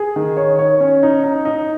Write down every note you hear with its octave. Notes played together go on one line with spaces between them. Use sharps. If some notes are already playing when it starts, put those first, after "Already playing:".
Already playing: G#4
D#3
C#5
C#5
C#4
D#4
D#4
D#4